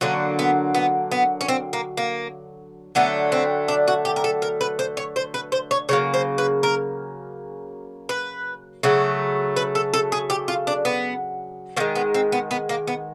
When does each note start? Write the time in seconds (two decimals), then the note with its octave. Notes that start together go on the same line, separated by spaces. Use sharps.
0.01 D3 F#3 A#3 C#4
0.39 B3
0.75 B3
1.11 B3
1.41 C#4
1.48 C4
1.73 A#3
1.97 A#3
2.95 D3 F#3 A3 B3
3.32 C4
3.68 D4
3.88 F#4
4.05 G4
4.16 A#4
4.24 A4
4.42 A#4
4.61 B4
4.79 C5
4.97 C#5
5.16 C5
5.34 B4
5.52 C5
5.71 C#5
5.89 C#3 F#3 A#3 C#5
6.14 C5
6.38 B4
6.63 A#4
8.09 B4
8.83 C#3 F#3 A3
9.56 B4
9.75 A4
9.94 A4
10.12 G#4
10.30 G4
10.48 F4
10.67 D4
10.85 B3
11.77 D#3 A#3
11.80 G#3
11.95 B3
12.14 C4
12.32 B3
12.51 B3
12.69 A#3
12.87 B3